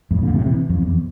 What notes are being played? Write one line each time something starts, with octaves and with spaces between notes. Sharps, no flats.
F2 A2
A#2 D3
A2 C3
C3 E3
F2
E2